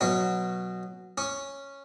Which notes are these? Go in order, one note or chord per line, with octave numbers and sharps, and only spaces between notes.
B2 F#3 C#4 C#5
C#4 C#5